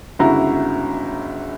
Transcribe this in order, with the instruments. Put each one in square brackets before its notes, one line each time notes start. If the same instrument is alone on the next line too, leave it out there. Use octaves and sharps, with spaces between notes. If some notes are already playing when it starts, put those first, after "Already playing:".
[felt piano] G1 C#2 E4 F#4 A#5